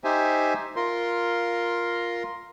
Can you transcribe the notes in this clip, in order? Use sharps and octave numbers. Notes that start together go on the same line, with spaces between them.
D#4 G4 C5 E5 G#5
F4 A#4 C6